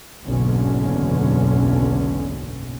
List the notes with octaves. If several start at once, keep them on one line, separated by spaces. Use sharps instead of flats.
F#1 B1 E2 G#2 D3 C#4